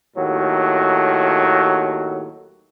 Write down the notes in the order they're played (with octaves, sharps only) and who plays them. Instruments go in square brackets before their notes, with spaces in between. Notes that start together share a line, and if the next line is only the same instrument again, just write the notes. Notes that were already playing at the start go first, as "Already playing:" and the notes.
[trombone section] D#2 A2 F#3